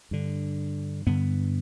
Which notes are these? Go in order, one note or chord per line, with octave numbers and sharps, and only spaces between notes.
G2 D3
G2 D3 B3